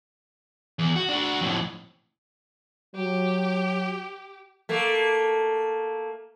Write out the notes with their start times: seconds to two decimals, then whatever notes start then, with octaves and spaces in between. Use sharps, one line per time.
0.79 E2
0.96 F#4
1.09 D4 F#4
1.41 F2 A2
2.95 F#3 G4
4.69 A3 A#3